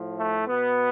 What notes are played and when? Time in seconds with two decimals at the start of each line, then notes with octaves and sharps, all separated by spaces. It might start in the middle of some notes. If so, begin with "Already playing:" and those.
Already playing: A2 F3
0.19 A3
0.47 B2 B3